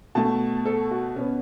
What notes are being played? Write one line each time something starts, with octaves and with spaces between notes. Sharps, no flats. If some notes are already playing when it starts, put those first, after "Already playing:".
B2 A3 A5
A4
F#4
B2 B3 C#4